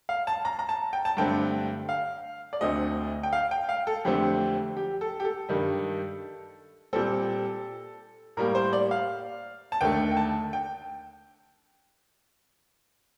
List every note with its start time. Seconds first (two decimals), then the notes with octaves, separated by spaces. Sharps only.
0.09 F5
0.27 A5
0.45 A#5
0.59 A#5
0.69 A5
0.93 G5
1.05 A5
1.17 G2 D3 A3 C4 G5
1.89 F5
2.53 D5
2.61 D2 D3 A3 C4 D#5
3.23 G5
3.33 F5
3.51 G5
3.69 F5
3.87 A4
4.05 F2 D3 A3 C4 G4
4.77 G4
5.01 A4
5.20 G4
5.25 A4
5.49 G2 D#3 G3
6.93 A#2 G3 C4 A4
8.37 A2 G3 A#3 A#4
8.55 C5
8.73 D5
8.91 F5
9.72 A5
9.81 D#2 D3 A3 G5
10.11 G5
10.17 A5
10.53 G5